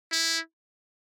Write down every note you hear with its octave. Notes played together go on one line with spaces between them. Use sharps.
E4